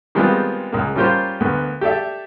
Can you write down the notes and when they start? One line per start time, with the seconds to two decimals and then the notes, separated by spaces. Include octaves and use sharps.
0.15 D#3 G3 G#3 B3 C4 F4
0.72 C#2 A#3
0.96 G3 C#4 F4 G4 A#4 C5
1.40 D2 A#3 B3
1.81 G4 A4 D5 E5